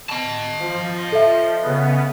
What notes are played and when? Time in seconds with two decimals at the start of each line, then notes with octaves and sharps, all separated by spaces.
0.10 D#5 A5
0.60 F3
1.12 A4 E5
1.62 C#3 B3